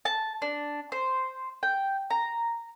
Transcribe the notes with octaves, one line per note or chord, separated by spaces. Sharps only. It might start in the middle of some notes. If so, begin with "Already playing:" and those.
A5
D4
C5
G5
A#5